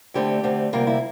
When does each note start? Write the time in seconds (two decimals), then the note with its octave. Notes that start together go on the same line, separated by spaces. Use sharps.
0.14 D2 D3 A3 C4 G4
0.43 D2 D3 A3 C4
0.73 D2 C3 G3 A#3 F4
0.87 E4